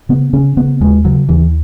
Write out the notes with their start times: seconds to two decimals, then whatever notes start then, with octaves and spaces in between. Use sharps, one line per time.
0.09 C#3 B3
0.33 C#3 C#4
0.57 C#3 B3
0.80 D#2 G#3
1.05 C#3 F#3
1.29 D#2 E3